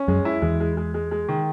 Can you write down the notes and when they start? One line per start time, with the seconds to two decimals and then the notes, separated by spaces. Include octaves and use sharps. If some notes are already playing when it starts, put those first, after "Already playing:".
Already playing: C#4
0.08 F#2 F#3 G#3
0.25 E4
0.42 E2 E3 G#3
0.60 G#3
0.77 G#3
0.94 G#3
1.11 G#3
1.28 D#3